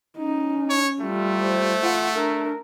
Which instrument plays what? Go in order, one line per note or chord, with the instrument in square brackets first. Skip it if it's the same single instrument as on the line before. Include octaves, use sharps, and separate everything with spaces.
[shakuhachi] C#4 [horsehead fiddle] D#4
[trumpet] C#5
[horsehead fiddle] G3 F4 [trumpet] A3
[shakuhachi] C5
[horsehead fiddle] F4 F#5
[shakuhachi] D4 [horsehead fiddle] A#4